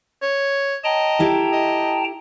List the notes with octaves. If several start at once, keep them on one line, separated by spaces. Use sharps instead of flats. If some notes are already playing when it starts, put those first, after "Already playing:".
C#5
D#5 G5 A5 A#5
E4 G4 A4
D#5